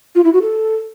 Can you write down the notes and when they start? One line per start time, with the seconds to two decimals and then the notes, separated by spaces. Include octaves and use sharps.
0.15 F4
0.24 E4
0.33 F#4
0.42 A4